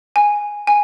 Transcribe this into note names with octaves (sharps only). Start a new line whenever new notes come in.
G#5
G#5